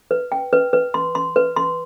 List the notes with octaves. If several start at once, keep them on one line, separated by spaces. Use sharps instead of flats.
B4
G5
B4
B4
C6
C6
B4
C6